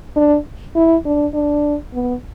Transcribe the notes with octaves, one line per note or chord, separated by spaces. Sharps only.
D4
E4
D4
D4
B3